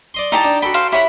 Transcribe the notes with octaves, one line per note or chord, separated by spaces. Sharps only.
D5 D#5 C6
D#4 E4 G4 A5
D4
F#4 A4 G5 B5
C5 F5
E4 G4 C#5 F#5 B5